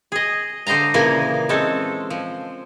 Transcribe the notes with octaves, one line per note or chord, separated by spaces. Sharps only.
G#4 D#5
D3 C5 D#5 F5 A#5
A#2 C#3 E3 F3 A#3 G#5
G#3 C4 C#4 A4
F3